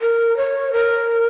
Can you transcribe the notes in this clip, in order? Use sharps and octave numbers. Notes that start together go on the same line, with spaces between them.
A#4
C#5
A#4